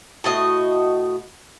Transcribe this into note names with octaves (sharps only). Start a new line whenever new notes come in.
A2 F#4 D#5